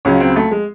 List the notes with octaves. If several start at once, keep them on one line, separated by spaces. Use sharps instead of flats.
C#2 C#3 F#3 C#4
C4
A3
G#3